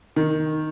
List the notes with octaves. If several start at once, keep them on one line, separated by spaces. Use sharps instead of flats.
D#3